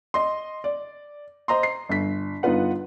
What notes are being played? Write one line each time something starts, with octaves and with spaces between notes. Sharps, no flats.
D#5 C6
D5
C5 D#5 A#5 C6
C7
G1 B6
G1 B3 D#4 F4 B4 F#5